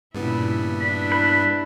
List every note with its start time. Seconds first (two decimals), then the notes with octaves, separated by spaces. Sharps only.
0.15 G2 A#2 C#3 G3 B3 E4
0.81 D4 E4 B5
1.12 B4